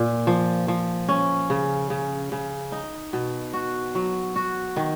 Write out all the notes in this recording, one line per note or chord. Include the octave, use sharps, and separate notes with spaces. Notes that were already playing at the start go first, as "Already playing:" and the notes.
Already playing: A#2
F3
F3
C#4
C#3
C#3
C#3
D#4
B2
F#4
F#3
F#4
D#3